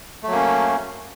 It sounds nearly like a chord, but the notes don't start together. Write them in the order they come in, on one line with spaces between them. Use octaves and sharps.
A3 F#3 A#3 C#4